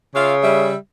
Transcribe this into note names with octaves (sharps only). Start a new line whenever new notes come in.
C#3 F4 E5 F5
G3 E5